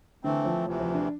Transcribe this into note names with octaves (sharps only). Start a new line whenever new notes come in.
D3 E3 A3 C4
F3
D2 C3 E3 F3
F3
D4